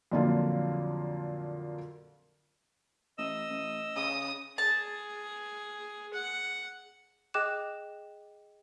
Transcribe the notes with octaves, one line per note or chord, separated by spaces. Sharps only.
F2 A#2 D3 F#3 A#3 F4
A1 D#5 E6
A1
C#3 D#6
G#4 A5
F#5
G#4 D#5 G5 D6 F#6 E7